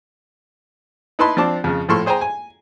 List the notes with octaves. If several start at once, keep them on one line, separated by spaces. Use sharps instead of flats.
D#4 E4 B4 A5 B5 C6
F3 C4 D4 A5 D6
F2 C#3
A2 F3 E4 A4 C6 C#6
G#4 C5 G5 G#5 A#5
G#5